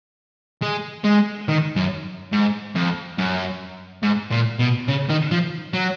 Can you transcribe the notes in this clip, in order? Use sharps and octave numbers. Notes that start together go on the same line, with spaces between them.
G#3
G#3
D#3
F#2
G#2
F2
F#2
G#2
A#2
B2
C#3
D#3
F3
F#3